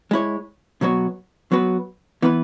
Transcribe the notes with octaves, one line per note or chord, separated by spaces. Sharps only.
G#3 E4 C#5
B2 F#3 B3 F#4 C#5
F#3 B3 F#4 B4
E3 B3 E4 B4